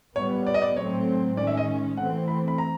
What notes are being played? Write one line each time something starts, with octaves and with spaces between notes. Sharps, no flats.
A#2 G3 B3 C#5
D5
D#5
D5
A2 F#3 A3 C4 C#5
D#3 G#3 C#4 D5
E5
D#5
E3 A3 C4 F#5
B5
B5
A#5